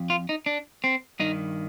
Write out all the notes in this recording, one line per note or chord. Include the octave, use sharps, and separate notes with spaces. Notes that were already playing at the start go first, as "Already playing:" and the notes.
Already playing: F2
F4
D#4
D4
C4
G2 D#3 D#4